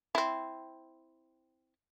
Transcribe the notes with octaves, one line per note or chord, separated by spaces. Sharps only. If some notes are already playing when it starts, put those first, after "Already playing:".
C4 E4